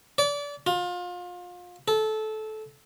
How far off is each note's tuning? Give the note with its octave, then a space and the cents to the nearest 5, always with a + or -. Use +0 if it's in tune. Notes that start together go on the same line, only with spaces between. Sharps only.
D5 -30
F4 +30
A4 -20